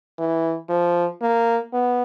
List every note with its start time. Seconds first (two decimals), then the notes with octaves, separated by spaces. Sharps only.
0.18 E3
0.69 F3
1.22 A#3
1.73 B3